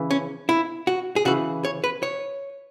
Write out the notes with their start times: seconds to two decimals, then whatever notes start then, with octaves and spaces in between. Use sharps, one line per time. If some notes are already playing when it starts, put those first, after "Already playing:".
Already playing: C#3 E3
0.11 C#4
0.49 E4
0.87 F#4
1.16 G#4
1.25 C#3 E3 F#4
1.65 C#5
1.84 B4
2.03 C#5